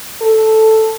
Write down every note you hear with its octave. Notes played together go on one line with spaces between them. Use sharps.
A4